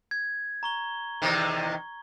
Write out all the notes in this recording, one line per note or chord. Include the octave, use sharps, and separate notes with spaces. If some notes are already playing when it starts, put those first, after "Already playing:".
G#6
A#5 C#6 G7
E2 C3 D#3